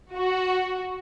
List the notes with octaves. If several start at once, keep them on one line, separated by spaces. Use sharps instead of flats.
F#4